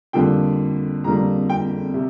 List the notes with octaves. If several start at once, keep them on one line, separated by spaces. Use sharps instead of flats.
F2 D3 G3 A#3 G5
F2 D3 G3 A#3 A#5
G5
C3